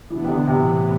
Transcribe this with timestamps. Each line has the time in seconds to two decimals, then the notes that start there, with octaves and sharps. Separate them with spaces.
0.10 B2 E3 B3 D4
0.24 C3
0.28 D3
0.46 A2 C3 E3 B3